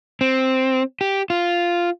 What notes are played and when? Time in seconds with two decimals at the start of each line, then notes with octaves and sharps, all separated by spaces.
0.21 C4
1.01 G4
1.30 F4